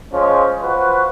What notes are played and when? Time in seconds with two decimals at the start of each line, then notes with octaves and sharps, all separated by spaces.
0.12 F3 G#3 C#4
0.61 F3 F#4 B4